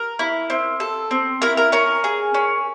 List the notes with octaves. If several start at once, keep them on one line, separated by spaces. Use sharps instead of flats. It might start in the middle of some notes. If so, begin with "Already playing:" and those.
Already playing: A#4
E4
C4
A4
C4
E4 A#4
A#4
C#4 A#4
G#4
C#4